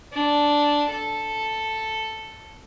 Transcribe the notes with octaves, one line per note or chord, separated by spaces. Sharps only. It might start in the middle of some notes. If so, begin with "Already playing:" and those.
D4
A4